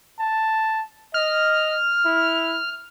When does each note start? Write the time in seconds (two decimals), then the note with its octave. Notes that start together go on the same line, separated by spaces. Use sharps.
0.19 A5
1.14 D#5 F6
2.05 E4